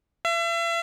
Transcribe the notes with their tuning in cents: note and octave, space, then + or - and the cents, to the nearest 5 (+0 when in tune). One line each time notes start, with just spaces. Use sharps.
E5 +40